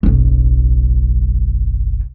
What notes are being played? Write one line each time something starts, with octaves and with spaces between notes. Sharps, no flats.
F#1 B1